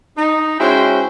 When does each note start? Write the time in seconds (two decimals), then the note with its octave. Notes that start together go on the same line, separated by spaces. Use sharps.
0.18 D#4
0.59 G#3 C#4 E4 F#4 C5 G5